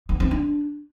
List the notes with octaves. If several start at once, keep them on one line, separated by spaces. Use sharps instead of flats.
B3
C4
D4